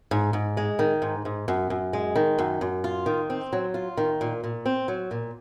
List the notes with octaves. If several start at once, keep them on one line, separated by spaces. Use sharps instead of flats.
G#2
G#2
G#3
D#3
G#2
G#2
F#2
F#2
G#3
D#3
F#2
F#2
F4
D#3
C4
F#3
F4
D#3
A#2
A#2
C4
F#3
A#2